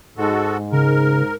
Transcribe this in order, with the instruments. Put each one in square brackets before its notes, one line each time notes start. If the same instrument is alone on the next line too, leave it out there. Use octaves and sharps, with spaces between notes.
[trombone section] G#2 [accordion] G#3 F#4 A4
[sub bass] C#3 [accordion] A#4